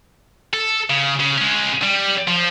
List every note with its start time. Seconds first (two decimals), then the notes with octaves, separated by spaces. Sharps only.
0.53 A4
0.90 C#3
1.20 C#3
1.38 G#3 C#4
1.83 G3
2.27 F3